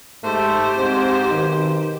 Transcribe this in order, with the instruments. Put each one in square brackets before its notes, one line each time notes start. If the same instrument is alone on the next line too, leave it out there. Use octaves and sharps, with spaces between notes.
[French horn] G#2 [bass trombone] A3 [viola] G4 C5
[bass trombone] G#2 [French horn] C4
[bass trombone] B1 [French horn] D#3